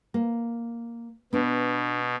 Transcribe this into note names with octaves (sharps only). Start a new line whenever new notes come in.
A#3
B2 B3 D4